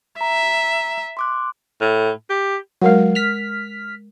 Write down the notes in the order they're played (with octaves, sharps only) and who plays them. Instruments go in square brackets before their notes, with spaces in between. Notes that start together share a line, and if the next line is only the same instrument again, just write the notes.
[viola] E5 [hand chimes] A#5
[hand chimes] C6 D6 F#6
[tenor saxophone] A2
G4
[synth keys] F#3 F5 [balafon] G#3 A#4 F#5
[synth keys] F6 B6